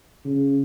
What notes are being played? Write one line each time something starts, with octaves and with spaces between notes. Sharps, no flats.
C#3